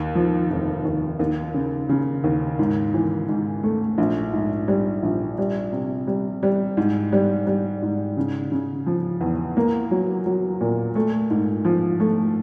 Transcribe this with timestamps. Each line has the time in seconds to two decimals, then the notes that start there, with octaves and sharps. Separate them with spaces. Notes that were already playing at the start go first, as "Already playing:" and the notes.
Already playing: D#2
0.15 F3
0.50 F1
0.85 D#2
1.19 D#2
1.54 C#3
1.89 C#3
2.24 D#2
2.59 G#2
2.94 E3
3.29 G#2
3.63 A3
3.98 A#1
4.33 G#2
4.68 G3
5.03 A#1
5.38 G3
5.72 C3
6.07 G3
6.43 G3
6.77 G#2
7.12 G3
7.47 G3
7.82 G#2
8.17 C#3
8.52 C#3
8.86 F3
9.21 E2
9.57 A#3
9.91 F#3
10.26 F#3
10.61 A#2
10.95 A3
11.30 G#2
11.65 F3
12.00 A3